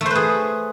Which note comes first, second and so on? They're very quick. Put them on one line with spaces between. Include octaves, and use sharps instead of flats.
A3 C5 B4 G#4